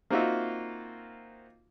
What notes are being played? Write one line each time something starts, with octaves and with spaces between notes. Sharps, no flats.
A#3 C4 D#4 F4 F#4 E5